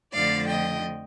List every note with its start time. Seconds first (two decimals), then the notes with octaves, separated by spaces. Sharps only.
0.13 F2 D3 F3 A3 D5 F5
0.48 D#5 G5